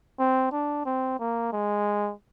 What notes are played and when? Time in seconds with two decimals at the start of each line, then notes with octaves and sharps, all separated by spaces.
0.19 C4
0.52 D4
0.85 C4
1.19 A#3
1.53 G#3